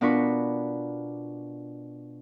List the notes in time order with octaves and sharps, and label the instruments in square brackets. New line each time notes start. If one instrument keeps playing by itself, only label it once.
[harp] B2 D4 F4 A#4 B5 C#6